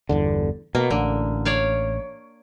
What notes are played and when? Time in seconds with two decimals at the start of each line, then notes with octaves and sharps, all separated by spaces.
0.09 G1 E2 D3
0.75 B2 A#3
0.91 A1 D3
1.45 C#5 D5 F5